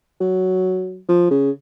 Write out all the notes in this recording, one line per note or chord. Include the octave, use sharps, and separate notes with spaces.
F#3
F3
C#3